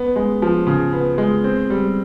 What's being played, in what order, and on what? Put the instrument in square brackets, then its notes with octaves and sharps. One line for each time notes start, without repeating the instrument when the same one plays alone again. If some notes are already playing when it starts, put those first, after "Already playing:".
Already playing: [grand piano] B3
G#3
F3
C#3
B3
G#3
C4
G3